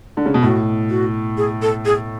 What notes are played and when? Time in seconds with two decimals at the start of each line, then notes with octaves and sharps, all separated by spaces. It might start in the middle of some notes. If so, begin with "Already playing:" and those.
0.17 D3
0.26 C#3
0.34 B2
0.43 A2 F#4
0.90 F#4
1.37 G#4
1.62 A4
1.85 G#4